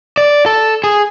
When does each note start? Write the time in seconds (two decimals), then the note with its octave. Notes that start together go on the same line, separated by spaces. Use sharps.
0.17 D5
0.46 A4
0.84 G#4